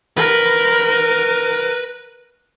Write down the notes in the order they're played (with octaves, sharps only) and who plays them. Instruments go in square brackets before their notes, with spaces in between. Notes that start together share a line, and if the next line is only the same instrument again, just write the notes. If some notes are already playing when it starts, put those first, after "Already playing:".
[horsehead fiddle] A#4 [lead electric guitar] B4